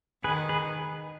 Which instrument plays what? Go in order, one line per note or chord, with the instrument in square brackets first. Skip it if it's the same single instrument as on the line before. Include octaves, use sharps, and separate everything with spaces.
[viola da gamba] D#3 [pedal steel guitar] G#4 B4
[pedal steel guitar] G#4 B4